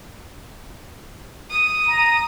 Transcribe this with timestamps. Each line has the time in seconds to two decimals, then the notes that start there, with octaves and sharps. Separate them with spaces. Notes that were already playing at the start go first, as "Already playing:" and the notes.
1.50 D#6
1.87 A#5